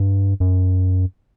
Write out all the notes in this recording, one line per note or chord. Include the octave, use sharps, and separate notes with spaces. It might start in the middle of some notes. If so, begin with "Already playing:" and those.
Already playing: G2
F#2